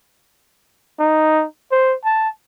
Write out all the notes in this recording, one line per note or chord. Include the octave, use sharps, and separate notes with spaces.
D#4
C5
A5